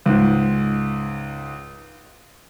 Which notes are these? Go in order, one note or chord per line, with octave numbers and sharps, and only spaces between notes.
C#2 G#2